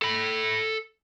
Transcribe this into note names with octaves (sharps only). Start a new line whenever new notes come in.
A4 B5